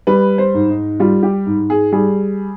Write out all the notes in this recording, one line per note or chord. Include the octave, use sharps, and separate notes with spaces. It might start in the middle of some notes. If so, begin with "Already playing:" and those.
G3 B4
C5
G#2
D#4
G3 F4
G4
G#2
G#4
G3 G#4